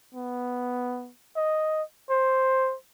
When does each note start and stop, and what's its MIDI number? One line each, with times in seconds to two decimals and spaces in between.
0.14 1.11 59
1.36 1.82 75
2.10 2.76 72